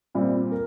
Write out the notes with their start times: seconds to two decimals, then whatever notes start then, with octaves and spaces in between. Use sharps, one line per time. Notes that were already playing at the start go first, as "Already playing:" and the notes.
0.15 A#2 G3 C4
0.52 A#4